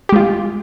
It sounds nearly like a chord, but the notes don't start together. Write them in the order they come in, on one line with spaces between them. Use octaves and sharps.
G4 G#3 F4